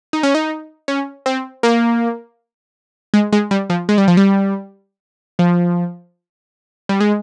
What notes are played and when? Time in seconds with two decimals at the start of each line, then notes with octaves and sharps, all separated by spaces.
0.13 D#4
0.23 C#4
0.35 D#4
0.88 C#4
1.26 C4
1.63 A#3
3.14 G#3
3.32 G#3
3.51 G3
3.70 F3
3.89 G#3
3.98 G3
4.08 F3
4.17 G3
5.39 F3
6.89 G3
7.01 G#3